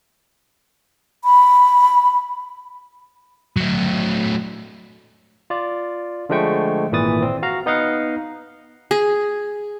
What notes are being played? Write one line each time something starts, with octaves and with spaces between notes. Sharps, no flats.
B5
F#3 A3
F4 D5
D3 F3 G#3 A3 G5 C#6
G#1 A#2 E3 B4 D#6 A6
C4
F#4 F5 A#5
B3 D#4 D#5 F5 F#5
G#4